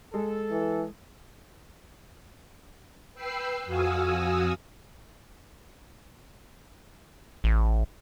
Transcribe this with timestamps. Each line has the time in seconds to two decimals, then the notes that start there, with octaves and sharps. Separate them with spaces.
0.14 G#3 A4
0.51 E3
3.14 B4 G5 E6 C7
3.65 F2 F#4 F5 G#5 D#6 E6
7.44 A1